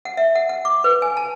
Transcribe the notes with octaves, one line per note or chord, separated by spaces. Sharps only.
F#5
E5
F#5
F#5
D6
B4
G#5
A5